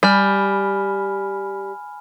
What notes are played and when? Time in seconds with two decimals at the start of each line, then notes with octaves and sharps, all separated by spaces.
0.03 G3 G#5 B5 F6